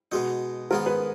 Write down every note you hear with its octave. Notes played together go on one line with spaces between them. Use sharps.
B2 G#3 D#4 F#4
G#2 D#3 G#3 B3 A#4
B4